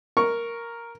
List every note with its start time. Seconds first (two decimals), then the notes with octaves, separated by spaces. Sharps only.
0.17 A#4 C#6